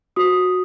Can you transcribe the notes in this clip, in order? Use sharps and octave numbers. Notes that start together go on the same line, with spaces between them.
F#4 D#6